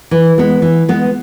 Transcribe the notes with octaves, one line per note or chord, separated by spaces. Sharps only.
E3
G#3 B3
E3
G#3 B3